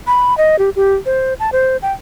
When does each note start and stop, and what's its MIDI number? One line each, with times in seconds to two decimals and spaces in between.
0.07 0.36 83
0.38 0.58 75
0.59 0.70 67
0.76 0.96 67
1.06 1.34 72
1.40 1.50 81
1.52 1.77 72
1.82 1.93 79